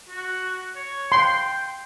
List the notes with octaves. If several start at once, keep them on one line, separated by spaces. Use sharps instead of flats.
F#4
C#5
G5 C6